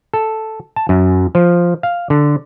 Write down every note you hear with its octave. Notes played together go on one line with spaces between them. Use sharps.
A4
A5
F#2
F3
F5
D3